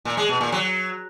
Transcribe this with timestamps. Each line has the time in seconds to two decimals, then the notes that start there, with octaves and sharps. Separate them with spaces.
0.05 A#2
0.17 G#3
0.29 B2
0.41 A#2
0.52 F#3